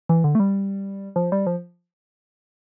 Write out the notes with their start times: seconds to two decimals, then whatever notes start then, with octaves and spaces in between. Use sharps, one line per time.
0.09 E3
0.24 D3
0.35 A3
0.40 G3
1.16 F3
1.32 G3
1.47 F3